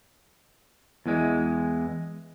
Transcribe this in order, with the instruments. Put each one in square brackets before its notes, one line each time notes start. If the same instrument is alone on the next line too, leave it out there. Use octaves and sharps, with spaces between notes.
[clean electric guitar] E2 E3 G#3